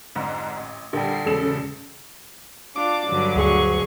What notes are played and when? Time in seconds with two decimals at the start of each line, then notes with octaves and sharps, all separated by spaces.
0.15 F2 G#2 D3
0.57 A1
0.93 A#1 D3 G3 G5 C7
1.25 E1 C#3 C#4 A4 E7
2.76 D4 F4 D6
3.07 G2 D3 F#3
3.36 D2 G#4 C#6